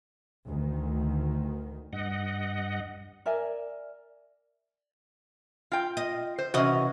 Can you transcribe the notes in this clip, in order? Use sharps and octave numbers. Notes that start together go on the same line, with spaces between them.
D2 D#3
G2 D#5 F#5
A#4 D5 E5 G#5
F4 G5
D#5
C5
C3 E3 C#4 F#4 D#5